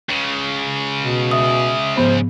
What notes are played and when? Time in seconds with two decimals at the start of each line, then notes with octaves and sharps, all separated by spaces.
0.10 C#2 C#3
1.01 B2
1.31 E5 D#6
1.97 G#2 F3 B3 C5